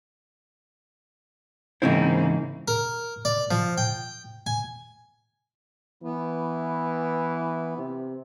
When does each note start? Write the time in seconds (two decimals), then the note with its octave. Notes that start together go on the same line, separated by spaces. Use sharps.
1.82 G#2 C#3 E3 A#3 C4 D#4 E4 C5
2.68 A#4
3.25 D5
3.51 F3
3.78 G5
4.47 G#5
6.03 E3 B3
7.78 C3